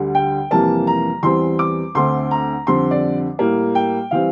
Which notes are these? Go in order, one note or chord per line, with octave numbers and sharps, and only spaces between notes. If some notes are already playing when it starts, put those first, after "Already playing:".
Already playing: D2 D3 G3
G5
F2 C3 E3 G3 A#3 A5
A#5
E2 E3 G3 C4 C6
D6
D2 D3 A3 C4 C6
A#5
F2 D3 G3 C4 C6
D5
A2 G3 A#3
G5
E3 G3 C4 F5